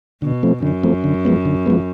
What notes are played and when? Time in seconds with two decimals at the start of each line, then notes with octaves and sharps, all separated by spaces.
0.22 B2 D3
0.43 F3 A3 C4
0.63 F#2 D3
0.83 F3 A3 C4
1.04 D3
1.25 F3 G#3 B3
1.45 D3
1.66 F3 G#3 B3